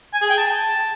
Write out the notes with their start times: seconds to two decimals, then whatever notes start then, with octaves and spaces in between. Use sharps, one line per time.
0.13 G#5
0.21 G#4
0.30 G5
0.38 A5